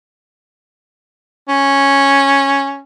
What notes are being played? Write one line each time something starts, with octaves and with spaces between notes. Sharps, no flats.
C#4